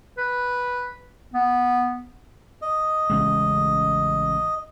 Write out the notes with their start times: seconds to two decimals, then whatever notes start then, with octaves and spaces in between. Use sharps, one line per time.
0.18 B4
1.34 B3
2.62 D#5
3.10 A1 C#3 G#3